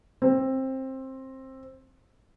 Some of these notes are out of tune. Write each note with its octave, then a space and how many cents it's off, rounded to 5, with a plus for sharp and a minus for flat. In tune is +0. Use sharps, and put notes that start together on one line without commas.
C4 +15